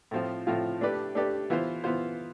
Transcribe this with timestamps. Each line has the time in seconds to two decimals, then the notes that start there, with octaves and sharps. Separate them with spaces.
0.11 A2 F3 C4 F4
0.47 A2 F3 C4 F4
0.81 A3 D4 G4 B4 D5
1.15 A3 D4 G4 B4 D5
1.50 E3 B3 F4 C5
1.84 E3 B3 F4 C5